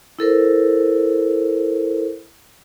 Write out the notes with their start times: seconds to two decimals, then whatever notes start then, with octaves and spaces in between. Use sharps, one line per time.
0.19 E4 A4 A#4 C5